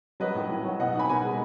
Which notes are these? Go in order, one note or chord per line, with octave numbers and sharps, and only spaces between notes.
F#3 B4 D#5
A2
A2
F#3
B2 D#5 F#5
D#4
G#5 B5
B2 G#5 B5
G#3